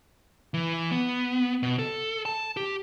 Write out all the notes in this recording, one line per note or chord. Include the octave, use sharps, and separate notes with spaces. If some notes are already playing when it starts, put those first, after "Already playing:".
E3
B3
B2
A4
A5
G4